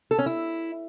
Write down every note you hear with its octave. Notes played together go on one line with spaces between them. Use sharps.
A4
C#4
E4